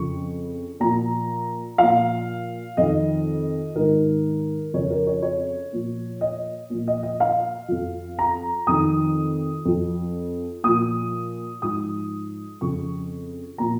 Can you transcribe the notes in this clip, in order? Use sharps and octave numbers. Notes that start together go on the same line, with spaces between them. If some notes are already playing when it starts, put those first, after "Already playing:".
Already playing: F2 C#3 F3 C#6
A#2 F3 A#5
A#2 F3 F5
F2 D#3 D#5
G#2 D#3 A#4
F2 C#3 F3 C#5
A#4
C#5
C#5
A#2 F3
D#5
A#2 F3
D#5
D#5
F5
F2 F3
A#5
F2 D#3 D#6
F2 F3
A#2 F3 D#6
G#2 F3 D#6
F2 C#3 F3 C#6
A#2 F3 A#5